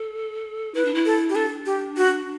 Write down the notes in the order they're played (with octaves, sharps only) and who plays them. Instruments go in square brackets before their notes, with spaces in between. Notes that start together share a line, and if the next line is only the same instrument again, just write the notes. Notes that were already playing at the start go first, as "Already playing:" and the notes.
Already playing: [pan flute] A4
[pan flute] E4 [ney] B4
[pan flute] D4
E4
[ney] A4
G4
[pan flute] D4 [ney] A4
[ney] G4
F#4